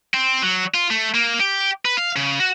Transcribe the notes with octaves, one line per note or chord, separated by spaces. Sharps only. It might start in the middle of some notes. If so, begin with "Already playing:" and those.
C4
F#3
F4
A3
A#3
G4
B4
F5
C#3
F#4